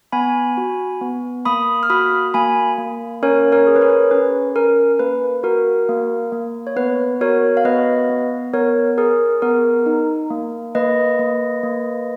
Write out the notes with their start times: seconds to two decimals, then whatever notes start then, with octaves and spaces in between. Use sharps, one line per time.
0.12 B3 G#5 B5
0.57 F#4
1.01 B3
1.45 A#3 B5 D#6
1.83 F6
1.90 F#4 B5 D#6
2.34 A#3 G#5 B5
2.78 A#3
3.23 C#4 A#4 C#5
3.52 A#4 C#5
3.67 G#4
3.76 B4
3.81 A#4 C#5
4.11 C#4 B4
4.55 C#4 A#4
4.99 A#3 B4
5.43 F#4 A#4
5.89 A#3
6.32 A#3
6.67 C#5
6.76 B3 B4
7.21 F#4 A#4 C#5
7.57 F5
7.65 B3 B4 D#5
8.09 B3
8.53 B3 A#4 C#5
8.98 G#4 A#4
9.42 B3 A#4
9.86 D#4
10.30 A#3
10.75 A#3 B4 D#5
11.19 A#3
11.63 A#3